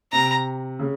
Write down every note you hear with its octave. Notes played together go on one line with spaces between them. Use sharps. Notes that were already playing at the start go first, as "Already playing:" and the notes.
C3 A#5
C#3